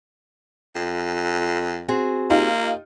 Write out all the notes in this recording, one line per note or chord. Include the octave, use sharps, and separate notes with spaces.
F2
C4 F#4 G#4
A#3 D#4 F4 G4